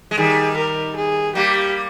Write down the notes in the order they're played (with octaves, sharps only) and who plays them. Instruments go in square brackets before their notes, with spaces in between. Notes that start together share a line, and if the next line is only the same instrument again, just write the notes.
[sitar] G#3
[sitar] D#3 G3 [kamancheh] G#4
[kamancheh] A#4
G#4
[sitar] G3 A#3 [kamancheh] G4